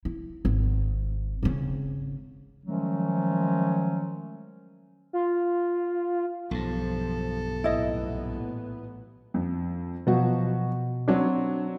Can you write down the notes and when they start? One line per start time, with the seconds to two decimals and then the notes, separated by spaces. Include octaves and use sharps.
0.05 E4
0.45 G#1
1.43 G#1 C#3
2.64 D#3 F3 F#3 G#3 A3 C#4
5.13 F4
6.51 B1 G2 F3 A4
7.64 A1 A#2 B3 E4 D#5
9.34 F2
10.07 B2 F3 F#3 F#4
11.08 F#3 C4 D4 C#5